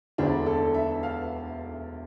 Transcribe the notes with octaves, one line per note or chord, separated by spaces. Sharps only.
E1 D2 D3 D4
A4
E5
F5